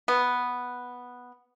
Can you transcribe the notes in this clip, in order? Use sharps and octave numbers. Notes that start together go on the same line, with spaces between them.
B3